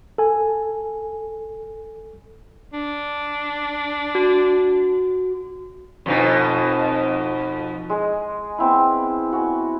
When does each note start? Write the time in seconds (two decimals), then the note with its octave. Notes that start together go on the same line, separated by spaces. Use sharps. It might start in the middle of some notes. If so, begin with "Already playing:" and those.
0.18 A4 G#5
2.73 D4
4.15 F#4
6.06 F2 B2 D#4
7.90 G#3 G#4 D#5
8.58 B3 C4 E4
9.32 F#4 G#5